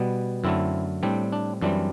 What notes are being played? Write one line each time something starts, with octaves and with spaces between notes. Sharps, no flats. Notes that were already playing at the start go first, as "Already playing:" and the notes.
Already playing: B2 G3 B3
F#2 D3 A3 C4 E4
A2 G3 C4 D4
D4
F#2 E3 G3 C4 D4